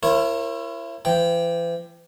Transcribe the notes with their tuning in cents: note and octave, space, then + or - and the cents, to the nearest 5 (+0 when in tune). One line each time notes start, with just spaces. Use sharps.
E4 +30 A#4 +0 C#5 -35
E3 +45 G5 +0